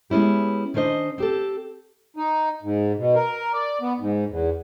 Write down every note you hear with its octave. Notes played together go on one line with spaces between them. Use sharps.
G#3 B3 C#4 E4 G4
D#3 C#4 D4 C5 D#5
C4 G4 A4
D#4
G#2
B2
A#4
D5
B3
G#2
E2